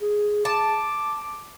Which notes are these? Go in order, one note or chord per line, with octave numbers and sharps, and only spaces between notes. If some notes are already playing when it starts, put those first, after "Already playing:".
G#4
A5 D6